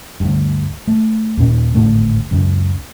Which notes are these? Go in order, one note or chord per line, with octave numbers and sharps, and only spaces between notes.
D2 G2
A3
D#2 A#2 C#4
G#1 D2 A2 A3
C#2 F#2